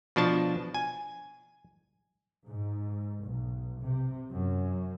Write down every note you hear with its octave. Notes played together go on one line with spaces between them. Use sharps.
B2 F3 D4 A5
G#5
G#2
B1
C3
F#2